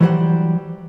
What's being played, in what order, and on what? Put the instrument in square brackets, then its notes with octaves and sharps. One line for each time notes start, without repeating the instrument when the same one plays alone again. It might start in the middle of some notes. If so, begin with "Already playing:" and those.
[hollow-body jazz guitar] E3 F#3 G3 F#4 C5 F#5